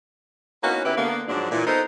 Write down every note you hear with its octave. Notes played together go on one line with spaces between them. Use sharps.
A#3 B3 C#4 D#4 E4 F#4
C#3 B3 E4 G4 B4
D3 A#3 B3
G#2 F3 F#3 D4
A#2 E3
B3 D#4 A4 A#4 C5